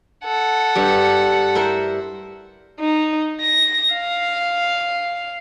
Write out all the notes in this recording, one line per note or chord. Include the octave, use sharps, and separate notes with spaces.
A4 F#5
G2 G3 G4
E4 A#4 C5
D#4
A#6
F5